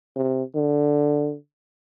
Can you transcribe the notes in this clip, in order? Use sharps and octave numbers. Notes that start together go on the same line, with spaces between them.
C3
D3